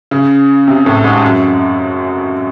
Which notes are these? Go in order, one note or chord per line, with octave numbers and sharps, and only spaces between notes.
C#3
C3
A2
G#2
F#2